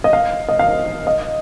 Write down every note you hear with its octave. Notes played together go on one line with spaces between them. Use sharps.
D#5
F5
D#5
F5
D#5